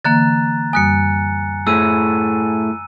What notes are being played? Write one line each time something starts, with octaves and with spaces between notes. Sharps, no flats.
D3 E3 A#3 A#5 F#6 A6
F#2 G3 G#5 D#6 F#6 C#7
A2 A3 G#4 E6 D#7